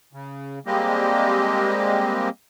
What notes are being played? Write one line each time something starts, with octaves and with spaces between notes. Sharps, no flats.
C#3
G3 G#3 A#3 C4 G4 D#5